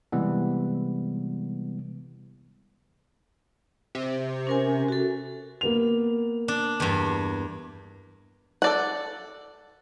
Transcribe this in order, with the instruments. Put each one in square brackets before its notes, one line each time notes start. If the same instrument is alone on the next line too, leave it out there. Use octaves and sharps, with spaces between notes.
[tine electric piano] C3 E3 G3 G#3 B3
[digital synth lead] C3
[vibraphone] C#4 A#4 G#5
F#4 A4
[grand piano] A#3 B3 F7
[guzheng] D4
E2 G2
[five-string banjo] A4 D5 F#5